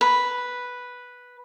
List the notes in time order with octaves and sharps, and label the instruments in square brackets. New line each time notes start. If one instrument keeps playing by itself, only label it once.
[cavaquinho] B4